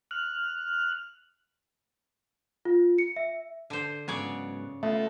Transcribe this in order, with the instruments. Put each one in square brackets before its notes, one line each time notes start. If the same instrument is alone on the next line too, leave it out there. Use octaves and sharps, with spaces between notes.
[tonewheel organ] F6 F#6
[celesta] F4
C#7
E5
[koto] D3 C5
[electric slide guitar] G#2 F#3 B3 [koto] C#3 C#5 D5
[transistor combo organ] A3 [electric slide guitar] B3 F4 [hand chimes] E5